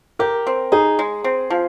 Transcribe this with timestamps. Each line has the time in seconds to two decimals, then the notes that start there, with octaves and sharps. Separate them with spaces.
0.19 G4 A#4
0.47 C4
0.72 D#4 G#4
0.99 G#3
1.24 C4
1.50 F3